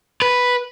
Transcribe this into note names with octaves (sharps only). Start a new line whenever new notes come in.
B4